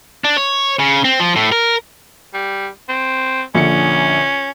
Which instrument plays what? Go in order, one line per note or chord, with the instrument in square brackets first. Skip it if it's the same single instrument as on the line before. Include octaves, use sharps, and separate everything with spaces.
[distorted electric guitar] D4
C#5
C#3
C4
F3
A2
A#4
[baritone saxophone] G3
C4
[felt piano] A#1 D3 C#7 [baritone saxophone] C#4